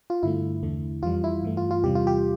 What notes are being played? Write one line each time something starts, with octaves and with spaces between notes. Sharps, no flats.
F4
G2 D3 A3 E4
E2 D3 A3
F2 E3 G3 F4
E4
G2 E3 A3
F4
F4
E2 C3 E3 G3 G4
F4
G4